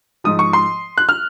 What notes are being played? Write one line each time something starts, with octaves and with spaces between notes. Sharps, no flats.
G#2 F3 D#6
C#6
C6
F#6
F6